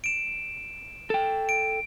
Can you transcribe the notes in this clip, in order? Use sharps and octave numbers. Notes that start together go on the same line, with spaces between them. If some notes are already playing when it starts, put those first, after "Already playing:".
D7 E7
A4 G5
D7